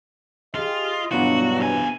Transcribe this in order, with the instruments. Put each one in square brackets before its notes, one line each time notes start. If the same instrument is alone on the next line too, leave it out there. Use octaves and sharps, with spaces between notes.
[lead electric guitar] F4 [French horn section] G4 G#4 [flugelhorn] D#5
[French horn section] G2 B2 E3 [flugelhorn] F#3 [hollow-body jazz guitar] B3 D4 F4 [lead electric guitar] F#4
[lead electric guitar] C3 G#5